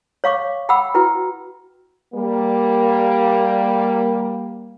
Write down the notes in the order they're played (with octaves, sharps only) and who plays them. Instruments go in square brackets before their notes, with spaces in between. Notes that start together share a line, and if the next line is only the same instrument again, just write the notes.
[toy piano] C#5 F5 C#6 D6
F#5 G5 B5 D6 E6
E4 F#4 B4 G5
[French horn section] G3 A#3